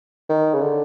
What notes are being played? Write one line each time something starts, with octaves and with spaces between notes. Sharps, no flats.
D#3
C#3
D3